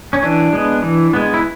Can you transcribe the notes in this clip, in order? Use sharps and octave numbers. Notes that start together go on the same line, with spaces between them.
C#4
E3 D4
G#3 B3
E3
G#3 B3
E4